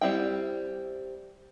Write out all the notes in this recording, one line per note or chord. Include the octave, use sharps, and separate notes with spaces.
G3 C4 E4 G5